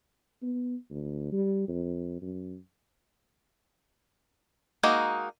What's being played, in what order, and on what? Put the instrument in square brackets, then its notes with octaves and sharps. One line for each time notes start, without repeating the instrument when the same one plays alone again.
[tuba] B3
D2
G3
F2
F#2
[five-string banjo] G#3 A#3 D#4 F#4